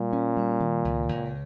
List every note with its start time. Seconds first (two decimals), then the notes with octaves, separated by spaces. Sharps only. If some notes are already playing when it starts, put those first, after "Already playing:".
Already playing: A#2 G3
0.13 C#4
0.37 G3
0.60 D#3
0.85 C#2
1.09 C#2